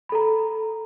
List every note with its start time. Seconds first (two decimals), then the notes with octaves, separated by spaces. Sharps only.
0.09 B5
0.12 A4
0.15 A#5